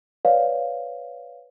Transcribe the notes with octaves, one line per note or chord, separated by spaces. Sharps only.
B4 C#5 D5 F5